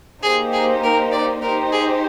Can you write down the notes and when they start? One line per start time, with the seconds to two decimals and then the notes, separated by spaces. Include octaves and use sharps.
0.23 A#3 D#4 G4 G#4 C5
0.53 G#4
0.83 A#4
1.12 D5
1.42 D#4 G4 A#4 C5
1.72 G#4